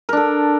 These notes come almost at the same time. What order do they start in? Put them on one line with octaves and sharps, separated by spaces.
A#4 D4 A4